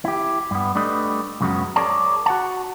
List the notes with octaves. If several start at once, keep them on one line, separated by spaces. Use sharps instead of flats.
E4 G4
G2 B3
G3 A3 D4 B4 D#5
C#2 F#2 C#3 F#3 B3
G#4 A#4 C#5 D5 A5
F#4 F#5 A5